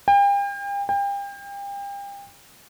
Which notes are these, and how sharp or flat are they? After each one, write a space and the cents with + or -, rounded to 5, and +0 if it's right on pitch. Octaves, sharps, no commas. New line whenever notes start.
G5 +40
G5 +35